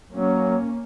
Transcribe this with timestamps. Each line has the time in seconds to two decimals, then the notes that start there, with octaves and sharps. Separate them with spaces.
0.11 F#3 A#3 C#4